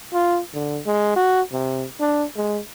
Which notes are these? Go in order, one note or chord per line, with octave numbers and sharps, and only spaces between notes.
F4
D3
G#3
F#4
C3
D4
G#3